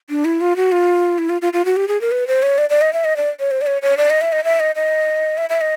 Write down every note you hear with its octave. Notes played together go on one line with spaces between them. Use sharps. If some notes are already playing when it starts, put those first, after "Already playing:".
D4
E4
F4
F#4
F4
E4
F4
F4
F4
F#4
G4
G#4
A#4
B4
C5
C#5
D5
D5
D#5
E5
D#5
D5
C#5
C5
D5
C#5
C#5
D5
D#5
E5
D#5
E5
D#5
D#5
E5
E5
D#5